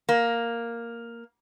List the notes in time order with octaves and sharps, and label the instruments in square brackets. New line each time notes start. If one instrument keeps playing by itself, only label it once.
[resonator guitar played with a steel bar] A#3